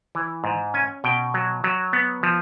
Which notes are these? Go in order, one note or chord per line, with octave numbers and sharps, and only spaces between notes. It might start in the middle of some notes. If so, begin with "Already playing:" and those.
E3
G#2
C#4 G#5
B2 G5
F#3
F#3
B3
F3